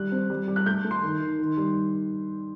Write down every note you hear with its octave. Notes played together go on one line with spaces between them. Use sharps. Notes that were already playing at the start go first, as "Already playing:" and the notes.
Already playing: G3 F#6
C4
G3
G3
F#6
A3 G6
A3
C6
D#3
D#3
D#3
G3